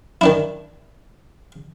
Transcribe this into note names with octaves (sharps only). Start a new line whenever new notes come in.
D#3 D4 E4